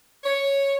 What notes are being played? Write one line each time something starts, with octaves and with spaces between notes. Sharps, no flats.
C#5